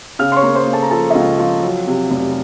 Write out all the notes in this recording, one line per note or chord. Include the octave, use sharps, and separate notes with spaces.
C#3 F5 F6
C6
C#5 C#6
A#3
C5 C6
A#3
A4 A5
A#5
F3 A4 A5
D#5
C#2 F4 F5
F3 F4 F5
F#3
C3
F1